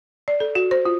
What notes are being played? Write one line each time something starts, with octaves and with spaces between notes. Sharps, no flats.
D5
A4
F#4
C5
F4